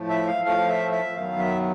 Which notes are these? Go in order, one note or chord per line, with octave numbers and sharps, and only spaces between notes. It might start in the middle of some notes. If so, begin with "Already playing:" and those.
Already playing: A2 F3 A3
E5
F5
A2 F3 A3 F5
E5
E5
F#2 D#3 F#3 B3 F5
E5